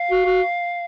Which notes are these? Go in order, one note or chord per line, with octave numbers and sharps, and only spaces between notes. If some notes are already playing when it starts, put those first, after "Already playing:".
Already playing: F5
F#4
F#4